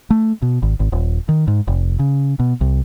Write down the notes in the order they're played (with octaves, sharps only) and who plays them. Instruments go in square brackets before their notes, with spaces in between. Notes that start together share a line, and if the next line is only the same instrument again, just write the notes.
[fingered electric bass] A3
B2
G#1
G#1
D#1
D#3
G#2
F1
C#3
B2
C2